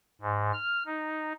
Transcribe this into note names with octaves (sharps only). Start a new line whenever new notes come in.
G#2
F6
D#4